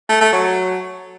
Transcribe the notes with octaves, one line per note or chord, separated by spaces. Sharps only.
A3
A3
F#3